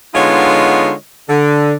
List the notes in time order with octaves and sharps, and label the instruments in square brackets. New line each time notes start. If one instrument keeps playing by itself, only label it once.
[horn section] D3 G#3 B3 D#4 F4 C#5
D3